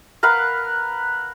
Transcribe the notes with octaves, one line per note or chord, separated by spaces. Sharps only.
A#4 B4 F5 F#5